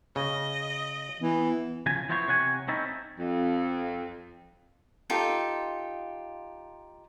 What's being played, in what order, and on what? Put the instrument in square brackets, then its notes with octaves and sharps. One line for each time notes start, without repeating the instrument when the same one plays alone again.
[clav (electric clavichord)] C#3 [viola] D#5
[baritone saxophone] E3 [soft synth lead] B3
[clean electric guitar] C#3 F3 G#5
E3 F3 B3 E4 C5 C#5
C3 C#5 F#5 G#5
C4 C#4 D#4 E4 A4
[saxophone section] F2
[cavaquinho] D#4 F4 G4 A4